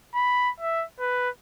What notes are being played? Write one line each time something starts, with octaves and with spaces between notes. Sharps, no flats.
B5
E5
B4